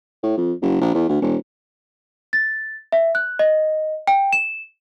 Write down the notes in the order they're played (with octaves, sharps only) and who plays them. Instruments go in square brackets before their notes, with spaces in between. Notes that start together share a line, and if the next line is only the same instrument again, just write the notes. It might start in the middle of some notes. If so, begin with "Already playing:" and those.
[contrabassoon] A2
F2
F#1
A#1
E2
D2
E1
[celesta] A6
E5
F#6
D#5
G5
E7